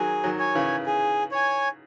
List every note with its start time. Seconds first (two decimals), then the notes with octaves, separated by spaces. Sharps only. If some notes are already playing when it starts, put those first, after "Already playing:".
Already playing: D#3 F#3 G#4
0.24 D#3 F#3
0.39 C#5 G#5
0.55 C#3 E3
0.86 G#4
1.31 C#5 G#5